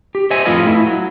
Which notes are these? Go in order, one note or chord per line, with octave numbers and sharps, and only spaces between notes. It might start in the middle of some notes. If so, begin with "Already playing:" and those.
G4
C5 C#5 D#5 E5 G#5
F2 A2 F4 B4 D#5 G#5
A3 E4
F#3